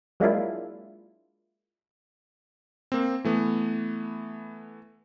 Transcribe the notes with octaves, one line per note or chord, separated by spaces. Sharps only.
F#3 G#3 A#3 D4 E4 F4
A#3 C4
E3 A3 B3